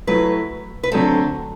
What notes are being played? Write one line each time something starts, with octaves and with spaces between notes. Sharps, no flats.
F#3 A3 E4 B4
B4
D3 F#3 A3 C4 A4